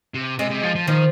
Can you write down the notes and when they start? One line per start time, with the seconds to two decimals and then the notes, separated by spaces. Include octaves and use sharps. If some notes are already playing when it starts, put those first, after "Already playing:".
0.14 C3
0.39 C3 G#3
0.51 C3
0.63 F3
0.76 F3
0.87 D#3 F3